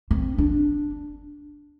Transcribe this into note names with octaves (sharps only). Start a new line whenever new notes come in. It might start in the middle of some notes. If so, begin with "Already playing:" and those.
C4
D4